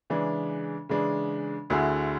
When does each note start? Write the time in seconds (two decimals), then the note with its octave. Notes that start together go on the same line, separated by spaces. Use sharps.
0.10 C#3 E3 G#3 D4
0.89 C#3 E3 G#3 D4
1.70 D2 D3 A3 E4 G#4